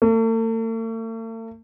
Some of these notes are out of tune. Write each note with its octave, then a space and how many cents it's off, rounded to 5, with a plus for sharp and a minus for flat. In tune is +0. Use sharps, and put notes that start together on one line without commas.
A3 +45